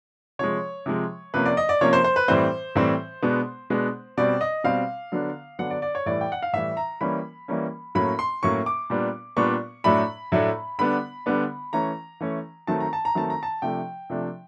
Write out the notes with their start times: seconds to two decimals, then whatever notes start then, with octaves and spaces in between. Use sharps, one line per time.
0.39 C3 F3 G#3 C#5
0.86 C3 F3 G#3
1.34 C3 F3 A#3 C#4 B4
1.46 D5
1.57 D#5
1.69 D5
1.81 C3 F3 A#3 C#4 C#5
1.93 C5
2.04 C5
2.16 B4
2.28 A2 E3 G3 C4 C5
2.75 A2 E3 G3 C4
3.23 B2 G#3 B3 D4
3.70 B2 G#3 B3 D4
4.17 B2 G3 C4 D5
4.41 D#5
4.64 B2 G3 C4 F5
5.12 D3 F#3 B3 D4
5.59 D3 F#3 B3 D4 F#5
5.70 D5
5.82 D5
5.95 C#5
6.06 A2 E3 G3 D5
6.21 G5
6.32 F#5
6.42 F5
6.53 A2 E3 G3 E5
6.77 A#5
7.01 E3 G3 A#3 C#4 B5
7.48 E3 G3 A#3 C#4
7.95 A2 F#3 A#3 C#4 B5
8.19 C6
8.43 A2 F#3 A#3 C#4 C#6
8.66 D6
8.90 A#2 G3 B3 D4
9.37 A#2 G3 B3 D4 C#6
9.84 A2 F#3 A3 D4 B5
10.32 A2 F#3 A3 D4
10.79 D3 G3 B3 D4 B5
11.26 D3 G3 B3 D4
11.73 E3 A3 C#4 A#5
12.20 E3 A3 C#4
12.67 D#3 F#3 A3 C4 A5
12.80 A#5
12.93 A5
13.05 A#5
13.15 D#3 F#3 A3 C4 A5
13.30 A#5
13.43 A5
13.62 C3 F3 A3 D4 G5
14.10 C3 F3 A3 D4